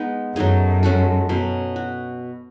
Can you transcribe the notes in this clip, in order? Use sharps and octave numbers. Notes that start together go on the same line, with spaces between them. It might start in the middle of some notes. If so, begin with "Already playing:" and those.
Already playing: G#3 B3 D#4
F#2 F#3 A3 D#4 G#4
G#3 C#4 F#4 A4
B2 F#3 C#4
F#4